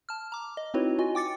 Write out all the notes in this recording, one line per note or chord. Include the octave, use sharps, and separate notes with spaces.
A5 F6
A#5 D6
D#5
C4 D#4 E4 F#4 B4 C#5
F4 F#4 D#5 G#5
G5 D6 A6 C#7